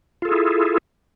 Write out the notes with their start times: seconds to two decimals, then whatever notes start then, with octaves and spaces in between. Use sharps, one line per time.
0.22 F4
0.25 A4
0.28 G#4
0.31 E4